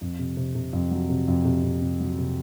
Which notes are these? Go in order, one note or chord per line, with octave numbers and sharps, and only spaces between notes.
F2
C3
C3
C3
F2
F#3
C3
F2
C3
C3
C3
F#3
C3